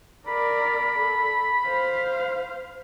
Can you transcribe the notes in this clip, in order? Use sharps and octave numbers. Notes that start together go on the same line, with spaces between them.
A#4 D5 B5
A4
C5 F5